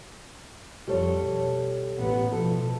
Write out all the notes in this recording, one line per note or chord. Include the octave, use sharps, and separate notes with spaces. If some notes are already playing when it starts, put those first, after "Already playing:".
F2 G3 A4 C#5
B2
A1 B3
B2 F3 A4